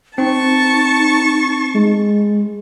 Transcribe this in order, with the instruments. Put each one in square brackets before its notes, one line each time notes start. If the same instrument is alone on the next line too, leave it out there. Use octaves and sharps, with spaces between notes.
[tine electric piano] C4 [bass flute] D#4 [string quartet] A5 C#6
[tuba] G#3